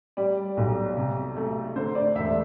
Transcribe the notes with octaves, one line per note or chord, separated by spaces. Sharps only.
G3 D5
B1
C3
A3
D3 C5
D5
E1 E5